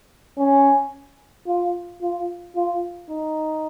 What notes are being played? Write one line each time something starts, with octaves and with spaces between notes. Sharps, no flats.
C#4
F4
F4
F4
D#4